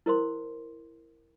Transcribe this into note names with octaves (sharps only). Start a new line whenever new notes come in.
E4 A#4 C5 C6